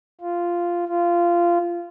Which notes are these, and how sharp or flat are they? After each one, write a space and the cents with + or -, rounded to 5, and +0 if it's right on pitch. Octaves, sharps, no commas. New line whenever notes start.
F4 -5
F4 -15